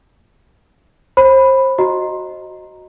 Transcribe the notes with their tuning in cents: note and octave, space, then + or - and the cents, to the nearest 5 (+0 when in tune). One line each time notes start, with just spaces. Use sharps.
C5 +25 B5 +0
F#4 +0 D#5 +0 A#5 +0